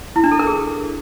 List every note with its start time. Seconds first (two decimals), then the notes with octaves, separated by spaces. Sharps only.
0.16 E4
0.24 D4
0.31 A4
0.39 A#4
0.47 G#4